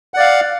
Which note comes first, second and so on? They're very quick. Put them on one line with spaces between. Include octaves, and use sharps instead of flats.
F#5 D5 F5